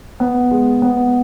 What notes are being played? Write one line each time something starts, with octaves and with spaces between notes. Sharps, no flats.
B3
G#3
B3